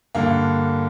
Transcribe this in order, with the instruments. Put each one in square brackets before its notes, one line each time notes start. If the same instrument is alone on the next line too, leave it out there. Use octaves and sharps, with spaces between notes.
[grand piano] G2 D3 A#3